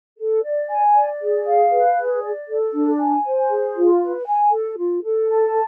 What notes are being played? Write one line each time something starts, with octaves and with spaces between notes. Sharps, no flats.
A4
D5
G#5
D5
G#4
F5
B4
G#4
D5
A4
D4
G#5
C5
G#4
F4
B4
G#5
A4
F4
A4
A5